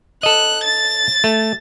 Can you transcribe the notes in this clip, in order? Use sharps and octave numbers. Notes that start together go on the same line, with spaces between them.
A4 D#5 F#6
A6
A3